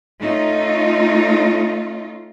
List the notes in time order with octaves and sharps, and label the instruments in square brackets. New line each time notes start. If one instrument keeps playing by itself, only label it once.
[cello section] A3 C#4 D#4 F4